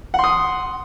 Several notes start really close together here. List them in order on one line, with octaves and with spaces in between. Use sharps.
F#5 C6 D#6